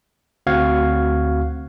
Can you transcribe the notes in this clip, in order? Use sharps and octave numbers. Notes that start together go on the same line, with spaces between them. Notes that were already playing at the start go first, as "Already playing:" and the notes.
D2 C4 F#4 F5 F#5 G#6